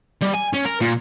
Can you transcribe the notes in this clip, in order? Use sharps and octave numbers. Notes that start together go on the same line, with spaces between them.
G3
G#5
C#4
A#4
A#2